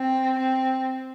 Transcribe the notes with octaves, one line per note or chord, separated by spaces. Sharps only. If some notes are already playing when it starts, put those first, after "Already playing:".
Already playing: C4
C4